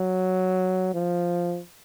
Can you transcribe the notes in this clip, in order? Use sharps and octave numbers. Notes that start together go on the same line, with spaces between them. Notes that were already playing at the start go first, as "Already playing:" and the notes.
Already playing: F#3
F3